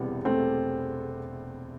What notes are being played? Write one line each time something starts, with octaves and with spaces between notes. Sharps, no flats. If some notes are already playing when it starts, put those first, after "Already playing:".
Already playing: E1 E2 C3 E3 G3 B3
A3 C4